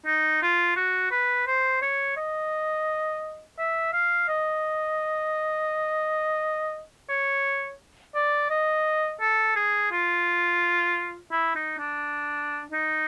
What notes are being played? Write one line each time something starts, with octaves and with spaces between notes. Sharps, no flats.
D#4
F4
F#4
B4
C5
C#5
D#5
E5
F5
D#5
C#5
D5
D#5
A4
G#4
F4
E4
D#4
D4
D#4